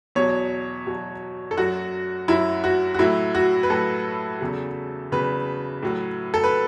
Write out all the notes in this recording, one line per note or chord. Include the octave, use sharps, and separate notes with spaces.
E2 B2 F#3 C#5
E2 B2 F#3
A4
F#2 F#3 F#4
F#2 F#3 E4
F#4
F#4
A2 F#3 E4
F#4
B4
A2 F#3 A4
E2 C#3 F#3
E2 C#3 F#3 B4
A2 F#3
A4
B4